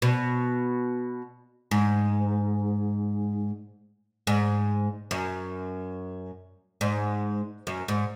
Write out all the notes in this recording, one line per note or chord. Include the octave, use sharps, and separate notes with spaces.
B2
G#2
G#2
F#2
G#2
F#2
G#2